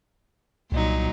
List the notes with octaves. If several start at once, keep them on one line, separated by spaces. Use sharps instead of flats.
C2 A#2 F#3 D#4